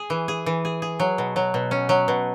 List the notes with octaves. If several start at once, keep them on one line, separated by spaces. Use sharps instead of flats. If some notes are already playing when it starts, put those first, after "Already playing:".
Already playing: G#4
E3
G#4
E3
G#4
G#4
F#3
B2
F#3
B2
C#4
F#3
B2